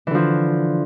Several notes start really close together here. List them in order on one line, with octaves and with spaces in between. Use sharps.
E3 D3 F3